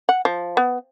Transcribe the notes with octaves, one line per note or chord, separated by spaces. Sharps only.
F#5
F3
B3